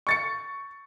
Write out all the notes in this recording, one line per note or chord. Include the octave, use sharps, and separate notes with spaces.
C#6 A6 C#7